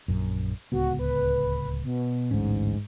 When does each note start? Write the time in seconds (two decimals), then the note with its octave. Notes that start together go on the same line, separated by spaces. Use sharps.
0.08 A#1 F#2
0.72 D1 C#2 B3 F#4
0.99 B4
1.84 B2
2.31 A1 D2 G#2 C#4